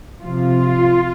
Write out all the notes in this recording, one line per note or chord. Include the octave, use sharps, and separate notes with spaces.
C3 F3 F4